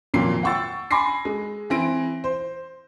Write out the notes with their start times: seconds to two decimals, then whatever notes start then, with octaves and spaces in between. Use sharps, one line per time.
0.14 G#1 F2 A#2 F#3 A#3 C7
0.43 F#5 G5 C#6 E6 A6
0.91 G#5 B5 C6 D6 A#6 C7
1.25 G#3
1.70 E3 C4 A#6 D7
2.24 C5